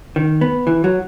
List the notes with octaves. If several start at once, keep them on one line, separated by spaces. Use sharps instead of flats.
D#3
B3
E3
F#3